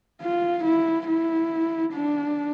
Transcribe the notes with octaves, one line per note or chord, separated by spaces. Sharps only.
F4
E4
E4
D4